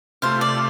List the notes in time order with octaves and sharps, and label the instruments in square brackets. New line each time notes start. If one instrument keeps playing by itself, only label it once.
[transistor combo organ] C3 A3 F4 [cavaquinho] C5 F5
[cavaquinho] D5